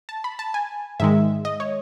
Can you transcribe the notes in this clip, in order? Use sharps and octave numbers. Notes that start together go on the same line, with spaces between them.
A5
B5
A5
G#5
G#2 D#3 G#3 E5
D#5
C#5